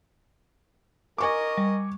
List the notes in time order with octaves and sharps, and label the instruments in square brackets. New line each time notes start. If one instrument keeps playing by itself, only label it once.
[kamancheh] A#4 D#5 [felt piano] G#5 C#6 D6
[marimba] G3